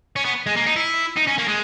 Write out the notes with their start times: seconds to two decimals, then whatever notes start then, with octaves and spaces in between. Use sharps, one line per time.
0.16 C#4
0.25 B3
0.46 G#3
0.56 A#3
0.66 D#4
0.76 E4
1.17 D#4
1.28 C#4
1.39 A#3
1.48 G#3